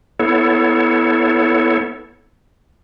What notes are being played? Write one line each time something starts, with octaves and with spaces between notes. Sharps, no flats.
B3 E4 A4 C#5